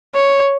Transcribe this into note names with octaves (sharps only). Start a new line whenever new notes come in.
C#5